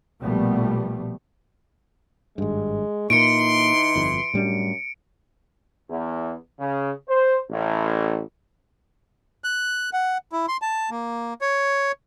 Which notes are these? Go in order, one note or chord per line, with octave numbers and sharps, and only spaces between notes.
A#1 B2 F3 G3 A3 B3
G#1 G2 G#3
A#2 E3 A#3 D#4 C6 C#7 D7
G1 F2
F#2 A2 G3 D4
E2
C#3
C5
A1
F#6
F#5
E4
C6
A5
A#3
C#5